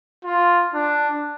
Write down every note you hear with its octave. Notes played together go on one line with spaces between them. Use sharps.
F4
D4